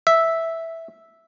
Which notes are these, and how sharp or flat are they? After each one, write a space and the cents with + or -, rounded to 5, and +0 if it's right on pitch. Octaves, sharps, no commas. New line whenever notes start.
E5 -5